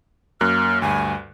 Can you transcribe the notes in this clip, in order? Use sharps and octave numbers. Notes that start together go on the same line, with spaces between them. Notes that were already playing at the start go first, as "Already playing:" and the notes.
F#2 A#3 F6 F#6
D2 G2 G#5